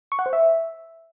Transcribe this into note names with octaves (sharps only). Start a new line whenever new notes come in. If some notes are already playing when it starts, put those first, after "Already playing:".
C#6
F#5
C5
E5